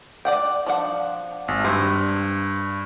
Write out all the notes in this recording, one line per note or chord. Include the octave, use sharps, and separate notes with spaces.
D5 F#5 G5
F3 D4 F#5
G#1
G2 C5